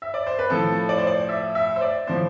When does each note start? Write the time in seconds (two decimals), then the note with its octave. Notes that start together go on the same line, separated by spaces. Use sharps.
0.02 E5
0.14 D5
0.27 C5
0.39 B4
0.50 A2 F3 A4
0.89 D5
0.98 C5
1.07 D5
1.29 E5
1.55 E5
1.76 C5
1.81 D5
2.07 A2 F3 C5